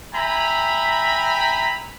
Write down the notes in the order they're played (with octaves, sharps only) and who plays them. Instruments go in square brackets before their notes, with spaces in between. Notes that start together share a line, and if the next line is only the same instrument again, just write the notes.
[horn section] E5 G5 G#5 A#5 B5